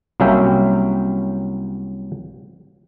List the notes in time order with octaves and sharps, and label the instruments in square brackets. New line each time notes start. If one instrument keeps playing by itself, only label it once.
[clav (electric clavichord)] C2 F#3 A#3 C#4 E5 G5